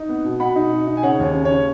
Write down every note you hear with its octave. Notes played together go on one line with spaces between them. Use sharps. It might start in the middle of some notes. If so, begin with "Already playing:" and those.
Already playing: D#4
B3
B2
B2 F#5 B5
D#4
B2
D#4
G#5
C#3 C#5 F#5
D#2 C#5
C#3
C#4 C#5